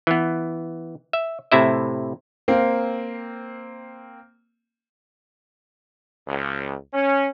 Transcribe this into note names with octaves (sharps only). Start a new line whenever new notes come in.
E3 B3
E5
A2 C3 E4 E5
A#3 C4
C#2
C#4